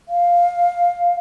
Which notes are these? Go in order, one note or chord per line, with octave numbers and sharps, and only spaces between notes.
F5